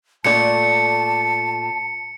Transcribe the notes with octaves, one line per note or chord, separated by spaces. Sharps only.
A#2 A3 D5 A5 C#7